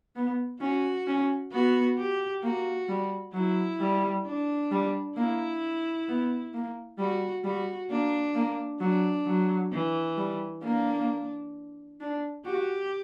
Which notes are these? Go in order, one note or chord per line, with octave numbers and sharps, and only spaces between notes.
B3
C#4 F#4
C#4
B3 F#4
G4
A#3 F#4
G3
F#3 E4
G3
D4
G3
A#3 E4
B3
A#3
G3 F#4
G3 F#4
A#3 D4
A#3
F#3 D4
F#3
E3
G3
A#3 D4
D4
F#4 G4